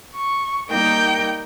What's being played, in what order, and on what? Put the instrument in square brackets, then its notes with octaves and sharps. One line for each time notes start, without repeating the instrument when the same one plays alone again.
[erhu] C#6
[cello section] G3 A#3 D#4 [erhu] G5